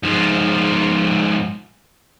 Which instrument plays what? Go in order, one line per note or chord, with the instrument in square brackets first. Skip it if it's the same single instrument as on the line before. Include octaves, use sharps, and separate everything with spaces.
[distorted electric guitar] G#2 F3